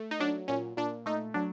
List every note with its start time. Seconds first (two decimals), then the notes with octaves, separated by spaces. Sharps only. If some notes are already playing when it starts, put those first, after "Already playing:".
Already playing: A3
0.11 D#4
0.20 F#3 D4
0.48 A#2 C#4
0.77 A#2 D4
1.06 A3 D#4
1.34 F#3 D4